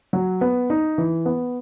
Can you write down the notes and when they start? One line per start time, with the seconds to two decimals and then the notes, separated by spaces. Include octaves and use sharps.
0.13 F#3
0.41 B3
0.70 D#4
0.98 E3
1.26 B3